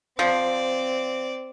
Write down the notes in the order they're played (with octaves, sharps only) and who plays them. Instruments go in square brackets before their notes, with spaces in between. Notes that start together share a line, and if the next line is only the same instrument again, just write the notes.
[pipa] F3 [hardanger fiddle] C4 D5